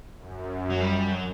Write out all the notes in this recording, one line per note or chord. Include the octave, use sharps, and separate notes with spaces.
F#2
F#3
F2 G3
F#3